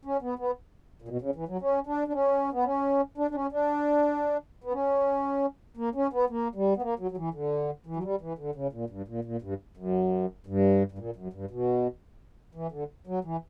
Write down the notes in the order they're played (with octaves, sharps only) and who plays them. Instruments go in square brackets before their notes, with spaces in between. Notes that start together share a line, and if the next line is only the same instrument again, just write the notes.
[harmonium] C#4
B3
B3
A#2
B2
C#3
E3
F#3
C#4
D4
D4
C#4
B3
C#4
D4
D4
C#4
D4
B3
C#4
A#3
C#4
B3
A#3
G3
B3
A#3
F#3
F#3
E3
D3
E3
F#3
G3
E3
D3
C#3
A#2
G2
A#2
A#2
G2
F#2
G2
G2
A#2
F#2
G2
B2
E3
D3
F#3
E3